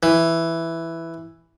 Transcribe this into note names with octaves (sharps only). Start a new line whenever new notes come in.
E3